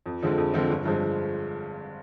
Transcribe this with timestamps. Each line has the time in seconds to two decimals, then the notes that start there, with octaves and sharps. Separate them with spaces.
0.06 F2
0.22 D3 F3 G#3 C4
0.38 F2
0.54 D3 F3 G#3 C4
0.70 G1
0.86 G2 F3 G#3